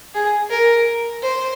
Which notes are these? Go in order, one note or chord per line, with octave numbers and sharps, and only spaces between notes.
G#4
A#4
C5